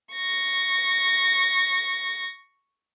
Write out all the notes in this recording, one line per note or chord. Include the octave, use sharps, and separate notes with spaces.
C#6 A#6